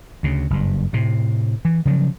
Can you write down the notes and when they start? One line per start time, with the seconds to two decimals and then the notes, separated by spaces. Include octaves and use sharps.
0.23 D2 C#3
0.50 F#1 G2
0.93 A2 C3
1.65 E3
1.85 C#3 F3 F#3